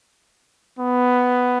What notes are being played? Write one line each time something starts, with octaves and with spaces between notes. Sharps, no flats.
B3